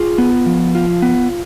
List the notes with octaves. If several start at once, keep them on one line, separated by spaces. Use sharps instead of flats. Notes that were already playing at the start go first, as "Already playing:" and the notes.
Already playing: F4 G#4
B3
F3
F4
B3